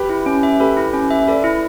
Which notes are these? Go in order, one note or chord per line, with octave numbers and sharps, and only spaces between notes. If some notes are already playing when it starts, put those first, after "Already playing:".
Already playing: G4 B4
E4
C#4
E5
G4 A4 B4
E4
C#4
E5
A4 B4 D5
E4